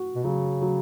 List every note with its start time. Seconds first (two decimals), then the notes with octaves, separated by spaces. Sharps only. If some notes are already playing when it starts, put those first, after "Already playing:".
Already playing: F#4
0.15 B2
0.24 C#3 F#3
0.62 F#3